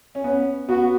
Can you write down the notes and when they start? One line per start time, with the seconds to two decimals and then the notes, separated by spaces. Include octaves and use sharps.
0.15 C#4
0.24 B3
0.68 B3 F#4